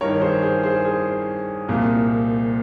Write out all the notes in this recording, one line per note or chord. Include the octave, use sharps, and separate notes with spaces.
G2 D#3 A#4 C#5
A#4
G#4 C5
G#4 C5
G#4 C5
G#4 C5
C2 A#2 F3